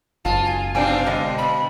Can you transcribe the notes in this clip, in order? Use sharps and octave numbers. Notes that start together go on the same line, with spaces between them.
F#1 G#2 F4 A5
G#5
B2 C4 D4 D#4 F5 G5 G#5
D3 G#3 D#5
B5